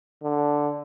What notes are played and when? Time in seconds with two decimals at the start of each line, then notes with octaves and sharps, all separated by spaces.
0.23 D3